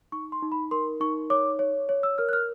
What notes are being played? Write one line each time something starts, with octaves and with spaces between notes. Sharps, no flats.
D#4 C#6
C6
D#4
B5
A#4 C6
D#4 C#6
C#5 D6
C#5
C#5
E6
A#4 F6
F#6
F6